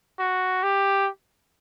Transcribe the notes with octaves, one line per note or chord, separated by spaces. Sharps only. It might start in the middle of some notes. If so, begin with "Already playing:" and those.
F#4
G4